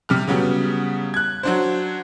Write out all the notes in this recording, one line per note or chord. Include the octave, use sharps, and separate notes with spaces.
C3 G3 F6
C#3 F#3 G3 B3
F#6 G#6
F#3 D4 C5